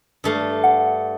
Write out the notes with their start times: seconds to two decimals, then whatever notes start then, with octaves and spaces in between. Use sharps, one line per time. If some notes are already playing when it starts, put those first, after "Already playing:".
0.24 G2 A3 F5
0.64 F#5